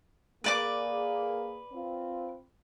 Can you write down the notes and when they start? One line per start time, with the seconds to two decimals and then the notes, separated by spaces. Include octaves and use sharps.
0.44 A#3 G#4 B4 D5 D6
1.73 C4 F4